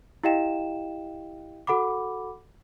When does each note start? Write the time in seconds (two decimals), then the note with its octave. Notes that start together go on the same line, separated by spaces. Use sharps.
0.24 E4 G4 D#5 F5 G5 E7
1.67 F#4 A4 F#5 B5 D6